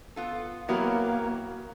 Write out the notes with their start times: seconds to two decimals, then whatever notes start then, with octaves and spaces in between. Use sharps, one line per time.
0.16 B3 F4 A4
0.68 F#3 A#3 B3 E4 F#4 G4 A#4